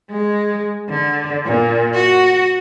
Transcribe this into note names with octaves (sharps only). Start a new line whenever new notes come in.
G#3
D3
A#2
F#4